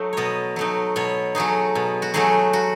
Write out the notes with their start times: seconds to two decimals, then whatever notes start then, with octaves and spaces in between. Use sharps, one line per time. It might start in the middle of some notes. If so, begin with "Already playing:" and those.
Already playing: F#3 A3 D#4
0.13 B2 C#5 D#5
0.56 F#3 A3 D#4
0.96 B2 C#5
1.35 F#3 A3 D#4 G#4
1.75 B2
2.02 F#4
2.14 F#3 A3 D#4 G#4
2.53 F#4